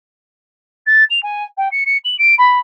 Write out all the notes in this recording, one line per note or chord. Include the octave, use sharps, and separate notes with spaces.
A6
F7
G#5
G5
C#7
C#7
F#7
D7
B5